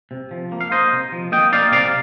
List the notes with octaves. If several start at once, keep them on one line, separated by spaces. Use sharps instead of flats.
C3
F3
A#3
F5
D#4 C5 D#5
C3
F3
A#3 D#5 G5
D#4 D5 F5
C3 D5 F5